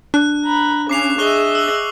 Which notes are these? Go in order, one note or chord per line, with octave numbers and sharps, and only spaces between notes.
D4 F#6
A#5 B5
C#3 C#4 D6 C7 F7
G#4 D#5 E5 C#6 F#6 G7
E6 F#7